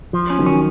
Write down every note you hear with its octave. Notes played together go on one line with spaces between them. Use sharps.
F3
C#4
D#3 F#3
C#4